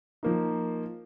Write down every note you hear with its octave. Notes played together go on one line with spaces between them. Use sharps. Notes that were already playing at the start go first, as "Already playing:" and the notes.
F3 A#3 D#4